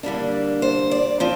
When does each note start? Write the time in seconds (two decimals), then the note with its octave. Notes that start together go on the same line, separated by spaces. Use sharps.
0.03 D3 G3 A#3 D4
0.62 C5
0.91 D5
1.20 F3 C4